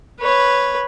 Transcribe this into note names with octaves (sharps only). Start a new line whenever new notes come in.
B4 C#5